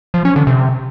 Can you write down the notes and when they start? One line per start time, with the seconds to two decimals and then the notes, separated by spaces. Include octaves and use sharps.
0.14 F3
0.25 C#4
0.36 D3
0.47 C3